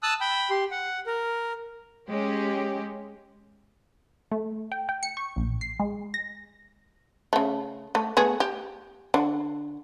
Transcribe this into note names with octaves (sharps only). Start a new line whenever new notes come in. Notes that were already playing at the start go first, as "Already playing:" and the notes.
A5 D#6 E6 F#6
G5 B5
G4 C6
F#5
A#4
G#3 C#4 G4
A3
G5
G5
C#7
C#6
A#1
C7
G#3
A#6
C#3 A3
A3
A3 B3 G#4
G4
D3